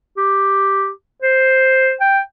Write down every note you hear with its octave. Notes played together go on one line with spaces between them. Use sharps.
G4
C5
G5